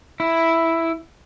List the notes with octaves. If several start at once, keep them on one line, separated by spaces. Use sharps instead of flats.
E4